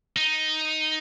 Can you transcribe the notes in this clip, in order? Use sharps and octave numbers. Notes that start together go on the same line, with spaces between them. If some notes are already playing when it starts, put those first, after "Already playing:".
D#4